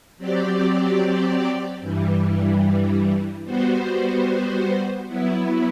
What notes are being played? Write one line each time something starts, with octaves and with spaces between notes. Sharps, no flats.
F#3 C4 G4 D5
G2 E3 G3
G3 B3 F#4 C5
F#3 B3 E4